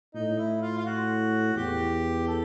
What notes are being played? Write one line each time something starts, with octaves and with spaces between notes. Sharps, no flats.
A2 D#4
E4
F4
F4
F#4
E2 G4
A4